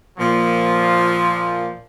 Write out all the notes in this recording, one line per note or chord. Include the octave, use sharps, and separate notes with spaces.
A#2 F3